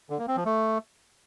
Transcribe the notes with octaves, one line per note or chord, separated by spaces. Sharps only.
D3
A#3
C4
F3
A3